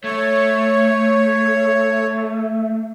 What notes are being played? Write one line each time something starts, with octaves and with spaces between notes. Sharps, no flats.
A3 C#5